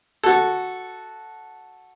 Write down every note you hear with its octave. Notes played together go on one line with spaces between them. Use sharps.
F#4 A4